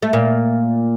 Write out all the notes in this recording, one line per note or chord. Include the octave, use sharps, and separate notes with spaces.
A3
A#2 A#3